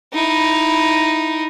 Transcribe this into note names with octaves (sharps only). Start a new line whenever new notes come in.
D#4 E4